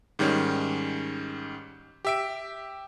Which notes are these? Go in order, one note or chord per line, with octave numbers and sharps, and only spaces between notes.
G#2 D#3 G3 C#4
G4 E5 D7